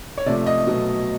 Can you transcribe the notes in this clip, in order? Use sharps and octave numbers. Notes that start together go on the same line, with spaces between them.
C#5
C3 F3 A3 D5
D#5
B2 F#3 A3